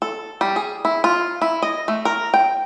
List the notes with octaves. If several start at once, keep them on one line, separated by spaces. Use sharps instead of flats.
A4
G3
G#4
E4
F4
E4
D#5
A3
A#4
G5